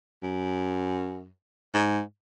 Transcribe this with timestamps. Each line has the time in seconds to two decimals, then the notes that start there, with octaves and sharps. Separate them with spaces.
0.22 F#2
1.74 G#2